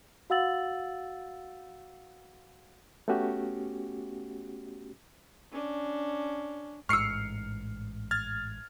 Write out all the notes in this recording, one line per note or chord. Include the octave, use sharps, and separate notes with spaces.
F#4 F5 F#5 E6 A6 F#7
A3 B3 C#4 F#4 G4
C#4 D4
A1 G#2 C#6 E6 F6 C7 C#7
F6 G#6 A6